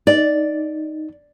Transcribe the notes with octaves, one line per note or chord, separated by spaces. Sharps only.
D#4 D5